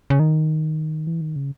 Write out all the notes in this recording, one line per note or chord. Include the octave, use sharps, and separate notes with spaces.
C#3
D#3
E3
D#3
C#3